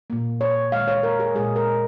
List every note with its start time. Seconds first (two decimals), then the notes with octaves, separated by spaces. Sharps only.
0.10 A#2 A#3
0.41 C#5
0.72 D#3 G#3 F5
0.88 C#5
1.03 A#4
1.20 G#4
1.35 A#2 G#3 G#4
1.56 A#4